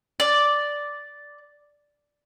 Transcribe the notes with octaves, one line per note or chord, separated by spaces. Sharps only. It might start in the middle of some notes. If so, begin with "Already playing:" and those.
D5